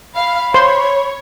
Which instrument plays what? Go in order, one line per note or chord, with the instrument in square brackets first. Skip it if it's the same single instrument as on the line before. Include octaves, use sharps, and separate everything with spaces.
[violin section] F5 [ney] B5
[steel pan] C5 C6 [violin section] C#5